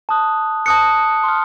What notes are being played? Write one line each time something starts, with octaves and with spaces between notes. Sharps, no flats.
A5 D#6 F#6
A5 D#6 F#6 C#7
C6 F6